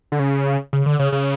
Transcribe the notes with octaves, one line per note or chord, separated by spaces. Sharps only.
D3
C#3
C#3
D3
C#3
C#3